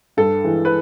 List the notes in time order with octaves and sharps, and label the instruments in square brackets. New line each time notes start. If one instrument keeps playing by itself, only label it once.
[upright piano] G2 A4
E3 G#3
B4